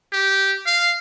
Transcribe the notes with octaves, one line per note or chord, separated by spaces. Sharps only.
G4
F5